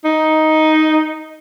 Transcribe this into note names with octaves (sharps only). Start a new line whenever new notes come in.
D#4